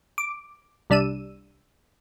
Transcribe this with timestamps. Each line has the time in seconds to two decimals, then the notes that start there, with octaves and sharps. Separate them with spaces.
0.18 D6
0.90 C2 G3 D4 E6 D#7